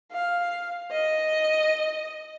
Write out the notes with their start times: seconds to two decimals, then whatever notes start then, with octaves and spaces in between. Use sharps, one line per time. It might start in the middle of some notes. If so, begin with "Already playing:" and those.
0.12 F5
0.91 D#5